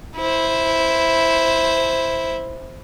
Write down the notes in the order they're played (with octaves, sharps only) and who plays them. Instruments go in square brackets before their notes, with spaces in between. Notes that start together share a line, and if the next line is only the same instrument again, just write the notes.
[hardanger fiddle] E4 C5